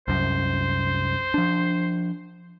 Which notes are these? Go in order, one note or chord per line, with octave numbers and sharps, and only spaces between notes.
C2 F#2 C5
F3 D4